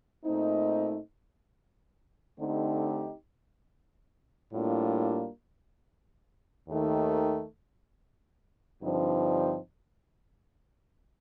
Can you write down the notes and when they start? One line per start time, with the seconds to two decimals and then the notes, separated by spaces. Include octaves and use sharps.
0.25 A#2 A3 C4 D#4
2.39 D3 A3 C4 D#4 G4
4.53 A2 G3 A#3 D4 F4
6.68 D#2 D#3 A3
8.83 G2 D3 F3 C4 D#4